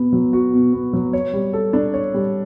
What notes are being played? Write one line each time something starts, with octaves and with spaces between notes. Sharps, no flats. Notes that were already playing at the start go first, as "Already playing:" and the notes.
Already playing: B2 B3
F#3
F#4
B2
B3
F#3
C#5
G3
A4
D4
C#5
G3